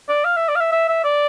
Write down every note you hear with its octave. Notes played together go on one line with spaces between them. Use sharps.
D5
F5
E5
D5
F5
E5
E5
E5
D5